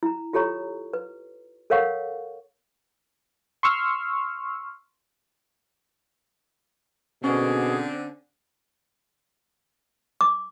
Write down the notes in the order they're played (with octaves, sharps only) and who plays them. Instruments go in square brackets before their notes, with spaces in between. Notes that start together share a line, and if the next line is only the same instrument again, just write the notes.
[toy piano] E4 A#5
F4 G4 A4 C#5 A#5 C#6
B4
A4 A#4 C#5 F5 F#5 C#6
[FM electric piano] C6 C#6 E6 F6
[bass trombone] B2 [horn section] D3 C4 [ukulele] C#4 [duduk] G#4
[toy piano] D6